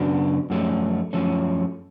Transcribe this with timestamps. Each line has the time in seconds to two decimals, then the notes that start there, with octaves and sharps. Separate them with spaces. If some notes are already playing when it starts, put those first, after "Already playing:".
Already playing: F#2 C#3 F#3 B3 D4
0.50 F#2 F3 A3 C#4
1.13 F#2 F3 A3 C#4